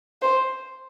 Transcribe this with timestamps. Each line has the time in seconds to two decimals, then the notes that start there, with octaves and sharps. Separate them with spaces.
0.22 C5